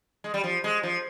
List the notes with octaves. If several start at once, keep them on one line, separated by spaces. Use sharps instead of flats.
G#3
G3
F3
G#3
F3